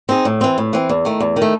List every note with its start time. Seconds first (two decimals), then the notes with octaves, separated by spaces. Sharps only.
0.09 C4 D#4 G#4
0.25 A2
0.41 E3 C4
0.58 A2
0.73 E3 C4
0.90 E2
1.05 D#3 A3
1.20 E2
1.36 D#3
1.42 A3